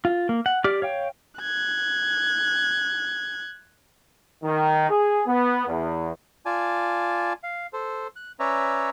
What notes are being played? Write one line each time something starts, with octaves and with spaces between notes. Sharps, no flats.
F4
A#3
F#5
G4 D5 D6 F6
C#5 F5 G5
F#6 G#6
D#3
G#4
B3
E2
F4 D5 G#5 A5
F5
A4 C5
F#6
C#4 B4 C#5 D5 E5 A#5